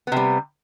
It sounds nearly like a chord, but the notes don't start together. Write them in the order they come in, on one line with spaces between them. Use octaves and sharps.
B3 C3 G3